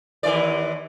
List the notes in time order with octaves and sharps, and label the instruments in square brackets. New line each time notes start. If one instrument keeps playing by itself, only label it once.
[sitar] D#2 E3 D5